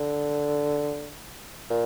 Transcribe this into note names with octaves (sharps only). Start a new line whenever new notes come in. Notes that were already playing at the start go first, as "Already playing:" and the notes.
Already playing: D3
A#2